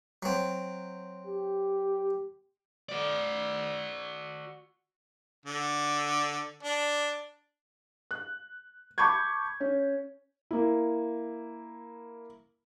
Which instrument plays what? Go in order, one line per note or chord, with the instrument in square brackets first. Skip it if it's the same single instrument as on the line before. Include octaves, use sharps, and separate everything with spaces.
[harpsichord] F#3 C4
[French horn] G4
[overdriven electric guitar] F#4 D5
[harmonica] D3
D4
[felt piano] F#6
A5 B5 C#6 D6 G6 G#6
C#4
A#3 E4